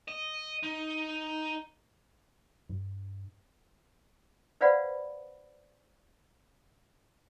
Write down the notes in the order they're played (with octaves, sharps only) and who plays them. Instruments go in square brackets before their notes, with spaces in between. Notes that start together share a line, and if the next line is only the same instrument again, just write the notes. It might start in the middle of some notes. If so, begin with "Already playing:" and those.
[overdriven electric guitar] D#5
D#4
[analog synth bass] G2
[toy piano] B4 C5 D5 F5 F#5 B5